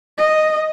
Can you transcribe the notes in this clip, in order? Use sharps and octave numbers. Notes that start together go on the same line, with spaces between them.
D#5